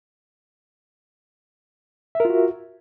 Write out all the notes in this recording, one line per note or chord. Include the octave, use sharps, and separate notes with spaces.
F4 F#4 A#4 E5